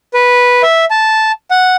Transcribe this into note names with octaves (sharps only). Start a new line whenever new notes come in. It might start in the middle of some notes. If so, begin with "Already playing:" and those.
B4
E5
A5
F#5